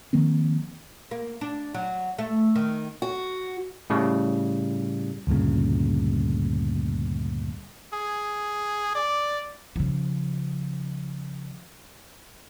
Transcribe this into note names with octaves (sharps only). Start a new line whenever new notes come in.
D#3 F3 A#3 C4
A#3
D4
F#3
A3
D#3
F#4
A2 C#3 G3
D2 G2 A#2 C#3
G#4
D5
C#3 F3